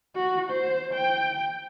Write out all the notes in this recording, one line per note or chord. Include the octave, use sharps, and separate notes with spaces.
F#4
C5
G5